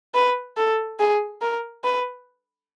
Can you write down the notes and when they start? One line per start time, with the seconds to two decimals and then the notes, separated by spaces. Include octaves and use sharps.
0.15 B4
0.57 A4
0.99 G#4
1.42 A#4
1.84 B4